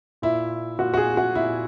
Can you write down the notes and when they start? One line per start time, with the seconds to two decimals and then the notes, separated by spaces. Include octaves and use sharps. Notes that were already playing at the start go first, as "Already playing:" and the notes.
0.22 A#2 E4
0.78 A#2 F#4
0.94 F#4
0.97 G#4
1.17 F#4
1.35 A#2 E4